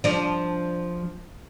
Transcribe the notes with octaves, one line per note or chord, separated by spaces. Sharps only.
F3 D4